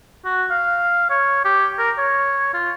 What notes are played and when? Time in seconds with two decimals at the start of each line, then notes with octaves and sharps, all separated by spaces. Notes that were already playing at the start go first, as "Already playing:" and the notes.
0.25 F#4
0.50 F5
1.09 C#5
1.44 G4
1.78 A#4
1.98 C#5
2.54 F4